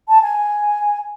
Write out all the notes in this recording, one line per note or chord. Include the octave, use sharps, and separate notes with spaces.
A5
G#5